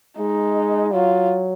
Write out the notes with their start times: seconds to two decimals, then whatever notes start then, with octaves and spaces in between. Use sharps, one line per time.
0.19 G#3 D#4
0.94 F#3 F4